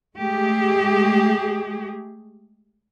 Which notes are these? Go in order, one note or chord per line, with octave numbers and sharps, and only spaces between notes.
G#3 A3 G4 G#4